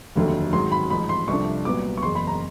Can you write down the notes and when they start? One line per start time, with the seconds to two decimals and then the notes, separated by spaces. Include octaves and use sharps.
0.15 F1 D#2 D3 F#3 A3
0.53 G#2 D#3 F#3 C6
0.72 B5
0.90 A1 G#2 F3 B5
1.09 C6
1.28 C2 C3 F3 A3 D4 C#6
1.65 C2 A#2 F#3 B3 D6
1.97 C#6
2.03 F#1 E2 C#3 C6
2.15 B5
2.27 A#5